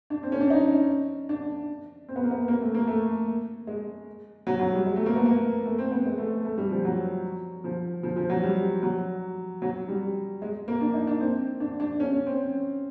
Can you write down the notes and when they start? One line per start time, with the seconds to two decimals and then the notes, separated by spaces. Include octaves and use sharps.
0.10 D4
0.23 C4
0.32 C#4
0.41 D4
0.50 D#4
1.29 D4
2.08 C4
2.16 B3
2.23 A#3
2.31 B3
2.48 A#3
2.61 A3
2.75 A#3
2.87 A3
3.67 G#3
4.47 F#3
4.60 F#3
4.73 G3
4.86 G#3
4.96 A3
5.06 A#3
5.16 B3
5.26 A#3
5.66 A3
5.78 C4
5.92 B3
6.06 G#3
6.18 A3
6.45 A3
6.58 G3
6.71 F3
6.85 F#3
7.64 F3
8.03 F3
8.16 F3
8.30 F#3
8.43 G3
8.83 F#3
9.62 F#3
9.88 G3
10.42 G#3
10.68 A#3
10.81 D4
10.94 D#4
11.07 D4
11.20 C4
11.60 D4
11.80 D4
12.00 C#4
12.13 C#4
12.26 C4